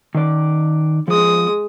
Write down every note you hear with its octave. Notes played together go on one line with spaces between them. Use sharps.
D#3 D5
F3 G#3 D#6